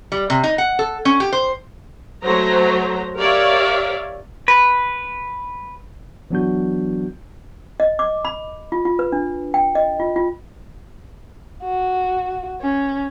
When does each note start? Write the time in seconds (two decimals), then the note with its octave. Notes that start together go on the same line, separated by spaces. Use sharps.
0.12 G3
0.30 C3
0.44 D#4
0.58 F#5
0.79 A4
1.05 C#4
1.20 G4
1.33 C5
2.22 F#3 A3 C5 A#5
3.16 G4 A#4 C#5 D5 E5 F5
4.48 B4
6.30 E3 F#3 B3 D4 F#4 G6
7.80 D#5
7.99 D6
8.25 B5
8.72 F4
8.85 F4
8.99 B4
9.12 D4
9.54 G5
9.75 D#5
10.00 F4
10.16 F4
11.63 F#4
12.61 C#4